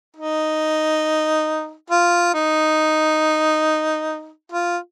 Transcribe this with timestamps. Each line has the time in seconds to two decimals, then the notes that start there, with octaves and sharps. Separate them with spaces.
0.17 D#4
1.90 F4
2.34 D#4
4.52 F4